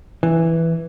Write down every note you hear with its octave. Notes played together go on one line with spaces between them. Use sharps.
E3